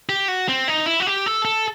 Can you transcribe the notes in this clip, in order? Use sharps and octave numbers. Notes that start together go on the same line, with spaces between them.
G4
F#4
C4
D#4
E4
F#4
G4
A4
A4